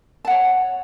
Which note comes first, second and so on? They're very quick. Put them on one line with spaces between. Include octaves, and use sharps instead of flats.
A5 F#5 C#5